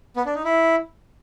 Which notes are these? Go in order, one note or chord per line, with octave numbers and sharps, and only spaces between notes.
B3
D4
D#4
E4